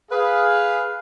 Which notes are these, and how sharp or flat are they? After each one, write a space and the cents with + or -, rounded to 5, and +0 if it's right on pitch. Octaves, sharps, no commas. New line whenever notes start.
G#4 +0 B4 +0 F5 +0